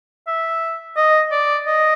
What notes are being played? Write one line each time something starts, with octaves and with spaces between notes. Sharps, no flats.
E5
D#5
D5
D#5